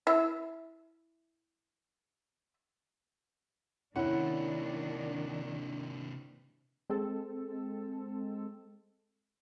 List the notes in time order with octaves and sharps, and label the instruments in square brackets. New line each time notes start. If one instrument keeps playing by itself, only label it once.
[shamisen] E4 E5
[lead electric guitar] C3 A#3 [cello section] D#3 D4 [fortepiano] C#4 E4 [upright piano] F#5
[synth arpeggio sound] G#3 C4 A4